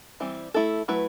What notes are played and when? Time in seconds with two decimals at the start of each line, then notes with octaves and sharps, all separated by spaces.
0.20 E3 G3 C4
0.54 A3 E4 A4
0.88 F#3 A3 E4 B4